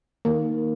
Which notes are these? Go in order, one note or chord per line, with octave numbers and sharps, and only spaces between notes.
D#3 A#3